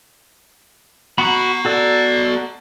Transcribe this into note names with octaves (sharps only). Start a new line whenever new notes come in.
B3 F#4 A#5 B5
F#4 A4 D5